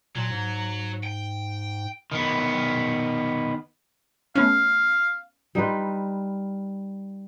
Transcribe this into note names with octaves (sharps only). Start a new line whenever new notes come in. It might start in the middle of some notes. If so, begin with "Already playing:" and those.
A#2 F#3
G#2
G5
D#3 B3
A3 B3 C#4 F5
G3 D#4 F4 B4